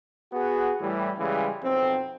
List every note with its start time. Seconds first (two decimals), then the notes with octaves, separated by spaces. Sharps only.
0.33 B3 F#4 G#4
0.81 A2 E3 G3
1.18 C#3 E3 G3 G#3
1.63 B1 F2 C4